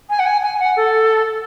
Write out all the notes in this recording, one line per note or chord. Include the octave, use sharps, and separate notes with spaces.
G#5
F#5
G#5
G#5
F#5
A4